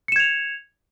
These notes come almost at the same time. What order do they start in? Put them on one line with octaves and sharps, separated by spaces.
C#7 E7 G#6 F7